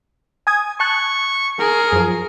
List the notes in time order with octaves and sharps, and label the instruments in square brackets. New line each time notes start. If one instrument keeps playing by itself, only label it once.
[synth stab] G#5 D#6 G#6
[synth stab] A5 F#6 [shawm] C#6
[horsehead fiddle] G#4 [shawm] A#4
[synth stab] F#2 F3